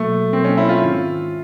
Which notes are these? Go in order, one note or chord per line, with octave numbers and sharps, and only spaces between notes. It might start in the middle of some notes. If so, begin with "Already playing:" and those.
Already playing: B2 F#3 A3 A#3
B2 F#3 A#3 C4
C#4
E4
F4
G#2 D#3 G#3